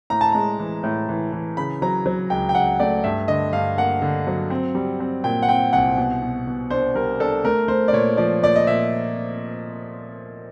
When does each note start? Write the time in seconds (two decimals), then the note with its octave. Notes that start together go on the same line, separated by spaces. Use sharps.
0.10 A2 A#5
0.21 A5
0.32 G#3 A#5
0.59 E3
0.83 A2
1.09 E3
1.32 E3
1.57 C#3 B5
1.82 F#3 A#5
2.06 F#3
2.30 C#2 G5
2.49 G5
2.55 C#2 F#5
2.80 A3 D5
3.04 G2 E5
3.28 D3 D#5
3.53 G2 F5
3.78 A#3 F#5
4.02 D3
4.27 F#3
4.50 C4
4.75 G3
5.00 C4
5.24 A#2 G5
5.42 F#5
5.49 C4 G5
5.73 C2 F#5
5.97 B2
6.22 B2
6.47 B2
6.70 D4 C5
6.95 G3 A#4
7.20 D4 A4
7.45 A3 A#4
7.68 A3 C5
7.88 D5
7.93 A#2 C#5
8.17 F3 D5
8.42 A#2 D5
8.56 D#5
8.67 A#2 E5